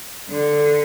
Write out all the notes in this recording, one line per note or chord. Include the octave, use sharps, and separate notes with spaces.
D3